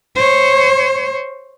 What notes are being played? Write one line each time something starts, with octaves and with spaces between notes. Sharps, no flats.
C5 C#5